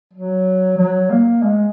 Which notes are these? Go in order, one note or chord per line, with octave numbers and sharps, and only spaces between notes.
F#3
F#3
A#3
G#3